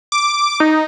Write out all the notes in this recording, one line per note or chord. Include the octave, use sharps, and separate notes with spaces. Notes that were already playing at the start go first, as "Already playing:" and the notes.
D6
D#4